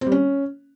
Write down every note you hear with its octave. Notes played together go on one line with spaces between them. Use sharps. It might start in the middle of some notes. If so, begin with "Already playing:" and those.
C4
G3
C#4